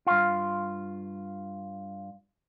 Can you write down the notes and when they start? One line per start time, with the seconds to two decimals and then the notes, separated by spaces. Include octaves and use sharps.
0.07 G2 F4